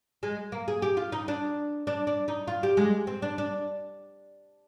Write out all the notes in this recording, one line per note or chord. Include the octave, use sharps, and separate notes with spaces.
G#3
A#3
G#4
G4
F4
D#4
D4
D4
D4
D#4
F4
G4
G#3
C4
D4
D4